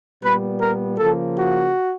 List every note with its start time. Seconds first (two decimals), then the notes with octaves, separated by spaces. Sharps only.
0.23 A#2 G3 B3 B4
0.60 A#4
0.97 C#3 F3 A#3 A4
1.35 F#4